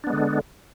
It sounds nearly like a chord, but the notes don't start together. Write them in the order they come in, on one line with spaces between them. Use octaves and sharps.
D4 B3 G#3 D3